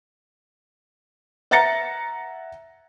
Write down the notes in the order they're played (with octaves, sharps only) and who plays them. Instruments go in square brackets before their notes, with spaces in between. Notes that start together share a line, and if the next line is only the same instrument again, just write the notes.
[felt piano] E5 F#5 A#5 A6 A#6 C#7